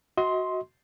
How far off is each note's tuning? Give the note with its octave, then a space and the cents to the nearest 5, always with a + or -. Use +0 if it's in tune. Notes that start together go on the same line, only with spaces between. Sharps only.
F#4 +0 D#5 +40 C6 +0